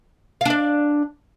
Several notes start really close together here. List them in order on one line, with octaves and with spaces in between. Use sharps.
F5 D4 D5